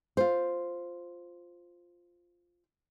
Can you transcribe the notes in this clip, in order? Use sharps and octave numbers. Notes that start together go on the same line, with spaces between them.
F4 C5